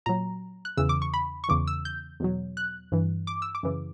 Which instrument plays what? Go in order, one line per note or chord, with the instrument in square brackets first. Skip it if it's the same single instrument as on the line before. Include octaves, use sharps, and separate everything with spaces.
[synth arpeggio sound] A#2 F#3 A#5
F#6
E2 C#3 E3 E6
D6
C#6
B5
C#6
E2 C#3 E3 D6
E6
G6
E2 B2 F#3
F#6
G2 E3
D6
E6
D6
F#2 C#3 E3